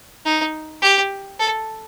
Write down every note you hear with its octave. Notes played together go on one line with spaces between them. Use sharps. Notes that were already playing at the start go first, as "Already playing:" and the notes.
D#4
G4
A4